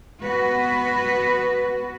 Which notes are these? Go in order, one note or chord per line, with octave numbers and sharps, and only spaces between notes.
B3 F#4 B4